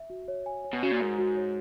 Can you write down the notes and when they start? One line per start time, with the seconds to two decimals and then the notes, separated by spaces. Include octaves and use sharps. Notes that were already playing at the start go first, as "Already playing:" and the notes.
Already playing: E5
0.10 F#4
0.28 C#5
0.46 G#5
0.64 C#5
0.73 B2
0.83 C#3 F#4
0.91 A#2
1.01 G#2 A#4
1.18 F#4
1.37 C#5